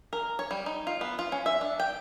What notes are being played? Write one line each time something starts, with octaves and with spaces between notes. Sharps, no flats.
A#4
C#5
G3
D#4
F4
B3
F4
C#4
E5
D4
G5